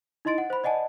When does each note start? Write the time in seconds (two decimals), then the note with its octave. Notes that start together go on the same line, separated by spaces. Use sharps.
0.25 D#4 E4 D#5 C6 A6 D7
0.38 F#5
0.50 C5 B5
0.64 D5 D#5 F#5 G#5 A5